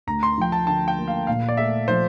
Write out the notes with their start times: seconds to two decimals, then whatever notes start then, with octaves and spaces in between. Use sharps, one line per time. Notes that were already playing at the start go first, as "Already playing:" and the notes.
0.07 D2 A#5
0.23 C6
0.38 F3 G5
0.52 A5
0.67 D3 A5
0.88 G5
0.98 A#3
1.08 F5
1.27 A#2 F5
1.49 D5
1.57 A3 E5
1.88 F3 C5